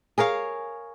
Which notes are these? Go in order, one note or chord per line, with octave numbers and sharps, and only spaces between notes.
G#4 A#4 C#5 F5